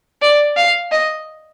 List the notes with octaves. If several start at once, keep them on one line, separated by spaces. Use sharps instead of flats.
D5
F5
D#5